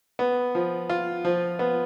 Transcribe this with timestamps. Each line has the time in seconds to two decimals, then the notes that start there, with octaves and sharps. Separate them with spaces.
0.19 B3
0.55 F3
0.89 F4
1.25 F3
1.59 B3